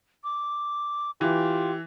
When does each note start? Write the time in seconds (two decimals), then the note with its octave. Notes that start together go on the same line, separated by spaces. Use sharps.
0.24 D6
1.21 E3 F4 G4